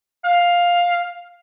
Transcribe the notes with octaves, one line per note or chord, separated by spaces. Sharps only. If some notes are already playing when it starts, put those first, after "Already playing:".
F5